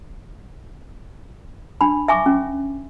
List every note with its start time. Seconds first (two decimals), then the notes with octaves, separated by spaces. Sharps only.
1.81 D4 B5
2.08 E5 G#5 C#6 D6
2.26 C#4